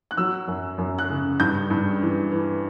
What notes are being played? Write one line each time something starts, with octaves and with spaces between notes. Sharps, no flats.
F#6
F#3 E6
F#2
F#2
F#6
C#3
G2 G6
G2
E3
E3